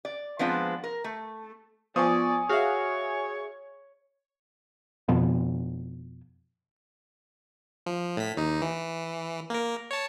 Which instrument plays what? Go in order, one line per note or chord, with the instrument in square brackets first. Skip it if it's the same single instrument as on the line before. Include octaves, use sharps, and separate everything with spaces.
[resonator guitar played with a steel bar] D5
F3 G#3 B3 C4 D4 F4
A#4
A3
[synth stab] F3 [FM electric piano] B3 [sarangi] D5 [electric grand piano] G#5 C#6 D#6
[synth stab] F#4 F5 [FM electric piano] G#4 E5 [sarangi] C#5
[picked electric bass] F2 B2
[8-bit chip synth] F3
A2 B6
D#2 D#4
E3
A#3 A#4
C#5 A5